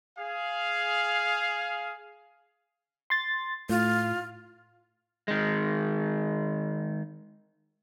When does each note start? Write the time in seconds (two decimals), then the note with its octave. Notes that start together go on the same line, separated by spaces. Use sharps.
0.17 G#4 F5
3.10 C6 A6
3.69 A2 F4
5.28 D#3 G#3